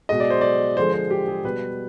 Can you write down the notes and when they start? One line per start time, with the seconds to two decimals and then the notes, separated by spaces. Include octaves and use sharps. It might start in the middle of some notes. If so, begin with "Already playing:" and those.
0.09 B2 G#3 D#5
0.20 D5
0.30 C5
0.41 D5
0.77 D3 F3 G#3 C5
0.93 C5
1.11 G4
1.28 G#4
1.44 B2 G3 B4